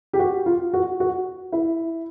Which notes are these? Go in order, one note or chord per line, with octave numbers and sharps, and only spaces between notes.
G4
F#4
F4
F#4
F#4
E4